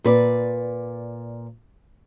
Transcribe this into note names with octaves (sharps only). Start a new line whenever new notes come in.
A#2 B4 D5